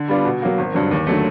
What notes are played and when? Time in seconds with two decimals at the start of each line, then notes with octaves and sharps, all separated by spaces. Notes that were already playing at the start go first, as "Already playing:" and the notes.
Already playing: D3
0.08 G3 B3 D4 F4
0.25 B2
0.42 F#3 A#3
0.58 G#1
0.74 G2 D3 F#3
0.91 D#2
1.07 D3 F#3 A3